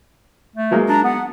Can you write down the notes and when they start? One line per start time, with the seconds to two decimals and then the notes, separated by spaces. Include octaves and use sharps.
0.56 A3
0.71 F#3 G#3 A#3
0.89 D4 A#5
1.04 B3 F#5